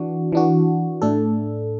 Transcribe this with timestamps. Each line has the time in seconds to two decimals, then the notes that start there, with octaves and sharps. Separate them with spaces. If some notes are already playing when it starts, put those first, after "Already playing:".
Already playing: E3 D4 F#4
0.32 E3 D4 F#4
1.02 A2 A3 D4 A4